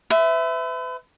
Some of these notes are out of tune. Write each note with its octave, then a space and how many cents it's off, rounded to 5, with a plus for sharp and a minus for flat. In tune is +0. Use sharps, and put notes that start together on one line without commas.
B4 +40 E5 +0